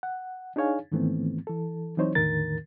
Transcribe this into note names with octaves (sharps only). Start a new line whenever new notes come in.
F#5
D4 D#4 G#4 C#5 F5 G#5
G#2 D#3 E3 A3 B3 C4
E3 A4
E3 F#3 C4 D#4 C5 C#5
E2 A2 D3 D#3 A#4 A6